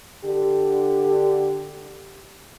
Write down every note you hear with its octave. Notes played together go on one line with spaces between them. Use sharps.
D3 G4